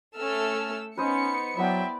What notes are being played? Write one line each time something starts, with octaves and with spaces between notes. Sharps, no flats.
A3 C#4 A4 E6 F6
B3 C#4 D#4 B4 C5 D#5 C#7
F#3 B3 E4 D5 E5 G5